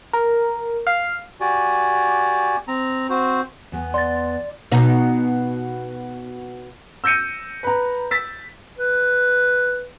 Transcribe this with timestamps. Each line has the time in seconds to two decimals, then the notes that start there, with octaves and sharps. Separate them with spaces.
0.13 A#4
0.87 F5
1.41 F#4 G4 D5 G#5
2.68 C4 A#5
3.10 C4 F#4 C5
3.72 E2 B3
3.94 D5 C6 A6
4.72 B2 D#4
7.04 E6 G6 A#6 C#7 D#7
7.63 B4 A#5
8.11 E6 A6 B6
8.78 B4